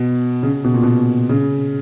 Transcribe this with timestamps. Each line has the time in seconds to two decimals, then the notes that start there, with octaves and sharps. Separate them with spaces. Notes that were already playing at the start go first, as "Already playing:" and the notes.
Already playing: B2
0.43 C#3
0.64 B2
0.74 A#2
0.83 B2
1.29 C#3